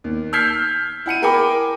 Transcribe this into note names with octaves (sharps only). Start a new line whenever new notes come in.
D#2
E6 F6 G6 G#6 B6 C7
E4 F#5 C#7 D#7
G#4 A#4 G5 G#5 B5 D6